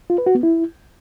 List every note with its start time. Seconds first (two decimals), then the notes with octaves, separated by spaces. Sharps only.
0.10 F4
0.18 B4
0.26 F#4
0.35 B3
0.43 E4